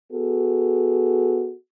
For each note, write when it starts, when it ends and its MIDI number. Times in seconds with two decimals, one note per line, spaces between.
0.11 1.53 59
0.11 1.53 66
0.11 1.53 68
0.11 1.53 69